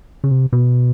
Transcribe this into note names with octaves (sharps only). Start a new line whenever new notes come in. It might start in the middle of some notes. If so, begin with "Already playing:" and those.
C#3
C3
B2